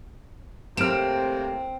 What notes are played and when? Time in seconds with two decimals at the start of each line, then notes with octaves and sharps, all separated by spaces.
0.77 A2 C3 A#3 C4 F6 D7 E7